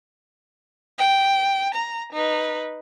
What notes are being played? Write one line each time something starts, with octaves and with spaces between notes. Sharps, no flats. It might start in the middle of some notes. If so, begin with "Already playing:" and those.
G5
A#5
D#4 B4